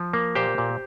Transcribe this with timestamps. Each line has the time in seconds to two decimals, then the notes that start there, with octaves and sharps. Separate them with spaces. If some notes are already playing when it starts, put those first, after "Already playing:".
Already playing: F3
0.13 A#3
0.35 A#2 G4 C5
0.58 A#2